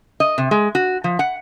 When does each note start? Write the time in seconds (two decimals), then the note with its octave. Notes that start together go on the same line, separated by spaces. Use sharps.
0.20 D#5
0.38 C3
0.51 G#3
0.75 F#4
1.04 F3
1.19 F#5